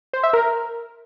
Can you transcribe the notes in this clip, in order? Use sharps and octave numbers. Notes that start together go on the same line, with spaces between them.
C5
E5
A#4